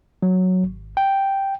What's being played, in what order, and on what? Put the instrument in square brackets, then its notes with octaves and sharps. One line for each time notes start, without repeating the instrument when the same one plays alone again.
[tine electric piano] F#3
G#1
G5